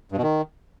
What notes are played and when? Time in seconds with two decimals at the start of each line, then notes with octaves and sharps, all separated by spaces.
0.12 G2
0.17 B2
0.23 D#3